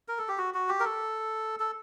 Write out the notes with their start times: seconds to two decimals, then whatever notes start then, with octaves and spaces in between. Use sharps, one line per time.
0.08 A#4
0.18 A4
0.28 G4
0.38 F#4
0.54 F#4
0.69 G4
0.80 A#4
0.85 A4
1.60 A4